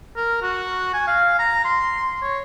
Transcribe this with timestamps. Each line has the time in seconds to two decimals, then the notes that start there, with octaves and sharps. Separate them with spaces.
0.16 A#4
0.42 F#4
0.93 G#5
1.07 F5
1.39 A#5
1.64 C6
2.22 C#5